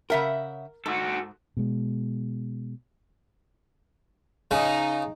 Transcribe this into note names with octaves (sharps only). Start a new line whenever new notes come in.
C#3 A#4 E5 F#5
G#2 F#4 A4
B2 G#3
C#3 D#4